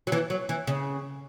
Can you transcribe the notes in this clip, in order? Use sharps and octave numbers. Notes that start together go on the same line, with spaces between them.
F#3
E3
F#3
E3
C#3